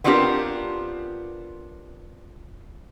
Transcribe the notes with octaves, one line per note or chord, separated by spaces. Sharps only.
B3 C4 D4 F4 G4 A#4